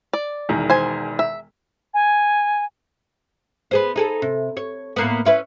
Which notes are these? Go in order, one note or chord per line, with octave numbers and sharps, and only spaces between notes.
D5
E1 E2 D#3
C5 G#5
E5
G#5
B3 G#4 C5
D#4 G#4 A4
C3
C#5
A2 A#3 B3
C#4 E4 B4